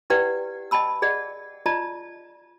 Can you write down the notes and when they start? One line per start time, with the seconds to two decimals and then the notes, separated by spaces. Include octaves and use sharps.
0.10 E4 G4 B4 D5 F#5 G5
0.71 D#5 G5 A5 B5 E6
1.02 G#4 D5 D#5 F#5
1.66 F4 D5 D#5 A5 A#5